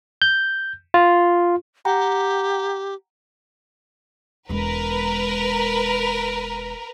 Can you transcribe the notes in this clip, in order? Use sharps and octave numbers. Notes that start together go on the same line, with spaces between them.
G6
F4
G4 F#5 G5 A#5
E1 G#3 A#4 B4